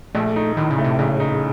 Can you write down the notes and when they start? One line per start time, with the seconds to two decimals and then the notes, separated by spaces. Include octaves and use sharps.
0.15 A#1 A3
0.36 D#4
0.57 A2 D#3
0.71 C#3
0.78 A3
0.84 C3
0.99 A#1 C#3
1.20 D#4